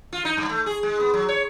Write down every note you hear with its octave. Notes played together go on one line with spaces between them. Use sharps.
F4
D#4
G2
A3
G#4
G#3
B3
F#3
C#5